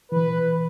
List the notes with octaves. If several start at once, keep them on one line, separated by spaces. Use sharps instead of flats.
E3 B4